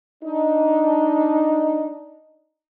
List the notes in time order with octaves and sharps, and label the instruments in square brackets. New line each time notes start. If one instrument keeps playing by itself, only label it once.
[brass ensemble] D4 D#4